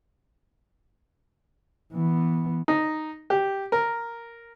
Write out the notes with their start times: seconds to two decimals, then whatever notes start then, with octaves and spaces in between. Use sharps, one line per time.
1.93 E3 B3
2.68 D#4
3.30 G4
3.72 A#4